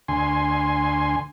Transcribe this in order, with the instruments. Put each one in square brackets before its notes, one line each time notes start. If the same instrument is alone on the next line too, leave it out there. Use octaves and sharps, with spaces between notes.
[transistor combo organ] D2 G#5 C6